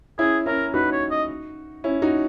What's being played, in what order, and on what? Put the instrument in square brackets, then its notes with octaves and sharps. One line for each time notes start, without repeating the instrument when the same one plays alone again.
[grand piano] C#4 E4 [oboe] G#4
[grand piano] C#4 E4 [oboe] A#4
[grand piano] D#4 F#4 [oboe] B4
[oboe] C#5
D#5
[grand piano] C#4 E4
D#4 F#4